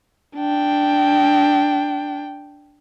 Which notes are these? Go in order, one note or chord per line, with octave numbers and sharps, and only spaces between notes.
D4 G5